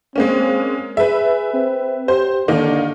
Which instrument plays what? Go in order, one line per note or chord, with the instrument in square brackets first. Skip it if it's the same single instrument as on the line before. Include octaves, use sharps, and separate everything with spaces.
[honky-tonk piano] G#3 A#3 C#4 [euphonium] C4
[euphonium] G#4 [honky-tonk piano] B4 E5
[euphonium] C4
[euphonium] G4 [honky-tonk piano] C5
[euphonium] D3 [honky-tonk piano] D#3 A#3 D#4